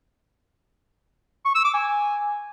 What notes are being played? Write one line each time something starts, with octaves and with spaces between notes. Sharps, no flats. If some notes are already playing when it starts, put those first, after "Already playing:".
C#6
E6
D6
G#5